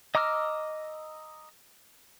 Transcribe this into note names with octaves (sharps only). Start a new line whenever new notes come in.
D#5 A#5 D6 E6 F6